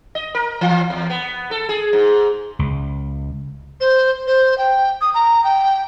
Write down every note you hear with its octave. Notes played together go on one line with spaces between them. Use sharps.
D#5
A#4
E3
E2
B3
A4
G#4
G#2
C#2
C5
C5
G5
D#6
A#5
G5